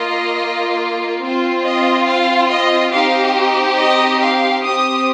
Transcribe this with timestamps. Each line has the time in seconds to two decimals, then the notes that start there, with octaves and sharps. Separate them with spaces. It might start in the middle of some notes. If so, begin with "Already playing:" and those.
Already playing: A#3 F4 D#5
1.20 C4
1.25 F4
1.63 D#5
2.06 F5
2.49 D#5
2.92 C4 D#4 G4 F5
3.78 D#5
4.21 F5
4.64 C4 G4 D#6